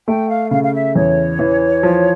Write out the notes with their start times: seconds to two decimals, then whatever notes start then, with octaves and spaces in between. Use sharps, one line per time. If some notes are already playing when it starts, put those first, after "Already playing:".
0.07 A3 G5
0.29 F5
0.51 C#3 F5
0.62 F5
0.73 E5
0.95 E2 C#5
1.39 E3
1.83 F3